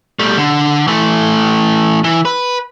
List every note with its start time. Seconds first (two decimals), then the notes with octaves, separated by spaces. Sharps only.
0.19 G3 A3
0.38 D3
0.88 E3 A3
2.04 E3
2.25 B4